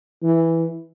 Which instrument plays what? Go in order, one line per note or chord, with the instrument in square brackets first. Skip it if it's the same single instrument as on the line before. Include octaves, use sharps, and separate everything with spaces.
[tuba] E3